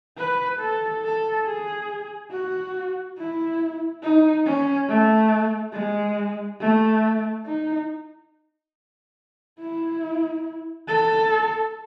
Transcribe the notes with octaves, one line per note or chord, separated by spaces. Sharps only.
B4
A4
A4
G#4
F#4
E4
D#4
C#4
A3
G#3
A3
D#4
E4
A4